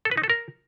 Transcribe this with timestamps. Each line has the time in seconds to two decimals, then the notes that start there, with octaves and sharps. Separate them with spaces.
0.05 A4
0.11 B4
0.17 D#4
0.23 A4
0.30 A#4